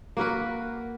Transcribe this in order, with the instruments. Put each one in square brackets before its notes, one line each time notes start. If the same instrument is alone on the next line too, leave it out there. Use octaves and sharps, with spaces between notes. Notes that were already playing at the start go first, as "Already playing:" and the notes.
[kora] A#3 F#4 A#4 B4